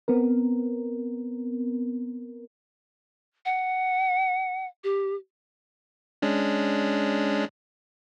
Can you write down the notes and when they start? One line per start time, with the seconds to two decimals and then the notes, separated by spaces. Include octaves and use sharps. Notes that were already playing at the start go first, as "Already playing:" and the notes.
0.08 B3 C4 A#4
3.45 F#5
4.84 G4
6.22 G#3 C#4 D4